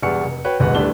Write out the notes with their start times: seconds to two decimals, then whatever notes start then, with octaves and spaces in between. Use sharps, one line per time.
0.02 E1 E2 G3 D5 C#6 C#7
0.24 F1
0.44 F#4 B4 C#5 G5
0.60 D#1 B1 G#3 B4 F#5
0.75 D1 G3 A3 D4 B4 G7